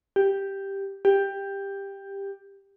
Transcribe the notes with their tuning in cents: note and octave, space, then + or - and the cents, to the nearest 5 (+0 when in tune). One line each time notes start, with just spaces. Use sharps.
G4 +0
G4 +10